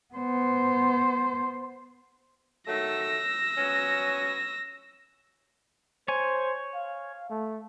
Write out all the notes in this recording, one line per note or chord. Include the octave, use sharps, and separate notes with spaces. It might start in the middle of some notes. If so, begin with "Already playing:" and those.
B3 C5
D#3 F#3 A3 E6 A#6
F#3 B3 C#4
C5 C#5 G#5
F5
A3